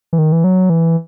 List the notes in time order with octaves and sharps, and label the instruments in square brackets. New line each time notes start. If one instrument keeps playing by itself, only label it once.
[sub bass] E3
D#3
E3
F#3
E3